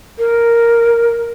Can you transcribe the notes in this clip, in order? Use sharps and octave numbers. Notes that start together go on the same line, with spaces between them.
A#4